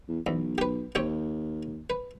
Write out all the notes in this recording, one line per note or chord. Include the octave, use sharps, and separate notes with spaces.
E2
B1 E2
G4 B4
D#2 C4 G4 C#5
B4